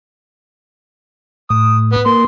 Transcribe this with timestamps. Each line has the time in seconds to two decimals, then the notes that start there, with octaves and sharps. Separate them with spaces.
1.50 A2 D#6
1.93 B3
2.06 A#3 C6